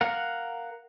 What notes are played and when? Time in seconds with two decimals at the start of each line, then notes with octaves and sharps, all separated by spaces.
0.01 A#4 F5 F#5